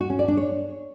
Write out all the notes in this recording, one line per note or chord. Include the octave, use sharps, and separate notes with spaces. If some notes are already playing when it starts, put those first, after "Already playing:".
F#4
C#4
D5
D4
C#5